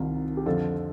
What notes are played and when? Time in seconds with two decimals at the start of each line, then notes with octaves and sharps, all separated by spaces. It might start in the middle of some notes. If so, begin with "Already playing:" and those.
Already playing: C2 C3 D#3 F4
0.37 G4
0.46 F2 D3 F3 F4 A4